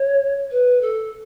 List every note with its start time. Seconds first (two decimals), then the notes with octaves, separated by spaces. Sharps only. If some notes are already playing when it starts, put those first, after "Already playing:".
Already playing: C#5
0.51 B4
0.81 A4